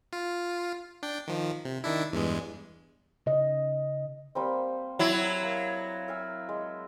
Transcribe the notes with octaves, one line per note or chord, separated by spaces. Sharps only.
F4
D4 G5
D#3 F3
C3
D#3 D4 E4
E2 G2 G#3
C#3 D#5
G3 A#3 C4
F#3 E4
A#3
E5 F5 G#5
G#3